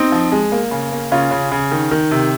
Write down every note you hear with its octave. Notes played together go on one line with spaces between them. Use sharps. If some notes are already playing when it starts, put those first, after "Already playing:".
Already playing: C4 D#4
F3
G#3
A#3
C#3
A#3
C#3 C#4 F4
C#3
C#3
D#3
D#3
C3